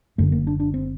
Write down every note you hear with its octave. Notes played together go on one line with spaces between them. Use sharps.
F#1 F#2 D3 A3
A#3
D4
D4
C4